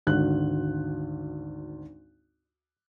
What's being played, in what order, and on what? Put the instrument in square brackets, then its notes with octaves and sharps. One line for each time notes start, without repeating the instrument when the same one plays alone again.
[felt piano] G#1 D2 F#6